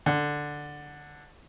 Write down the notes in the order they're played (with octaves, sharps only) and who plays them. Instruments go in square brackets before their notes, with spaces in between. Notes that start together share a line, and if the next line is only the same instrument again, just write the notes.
[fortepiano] D3